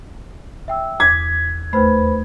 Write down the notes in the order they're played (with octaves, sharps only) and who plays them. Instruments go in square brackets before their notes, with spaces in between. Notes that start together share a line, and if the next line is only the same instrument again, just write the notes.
[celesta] E5 G5 E6
[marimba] E2 D6 [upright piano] G#6 [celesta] B6
[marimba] D#2 A3 [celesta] B4 C5 B5